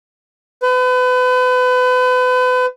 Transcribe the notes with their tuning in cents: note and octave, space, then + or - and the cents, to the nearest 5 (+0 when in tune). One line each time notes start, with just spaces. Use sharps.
B4 +35